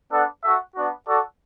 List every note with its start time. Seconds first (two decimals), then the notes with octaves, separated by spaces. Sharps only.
0.12 B3 D4 A4 F#5
0.43 F#4 A4 E5
0.75 B3 D4 F#4
1.07 F#4 A4 D5